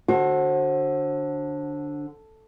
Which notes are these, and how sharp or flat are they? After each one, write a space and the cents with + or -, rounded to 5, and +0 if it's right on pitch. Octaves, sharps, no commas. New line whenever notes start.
D3 +0 F#4 +0 C5 +35